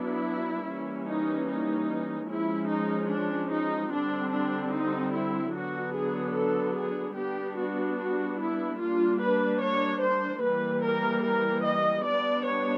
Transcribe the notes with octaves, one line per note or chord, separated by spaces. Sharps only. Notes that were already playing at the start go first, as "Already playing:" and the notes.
Already playing: F#3 B3 D4 E4
E3 G3 A#3 C#4
D#4
D#4
F3 G#3 C#4 E4
D#4
D4
D#4
D3 G3 C4 D4
D4
D#4
E4
D3 F#3 B3 D4 F#4
G#4
A4
G#4
G3 B3 D4 G4
F#4
F#4
E4
G3 A#3 D4 F4
B4
C#5
C5
E3 G3 A#3 B4
A#4
A#4
D#5
G3 B3 D4 D5
C#5